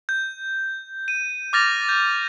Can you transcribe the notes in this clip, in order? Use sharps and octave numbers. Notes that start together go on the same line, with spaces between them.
G6
D#7
D6 F6 A6 A#6 F7
G6